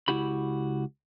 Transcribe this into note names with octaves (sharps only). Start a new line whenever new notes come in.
C#2 E4 F#4 G4 B5